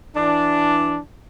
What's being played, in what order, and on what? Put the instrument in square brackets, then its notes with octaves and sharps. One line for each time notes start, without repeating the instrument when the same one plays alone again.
[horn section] E3 D4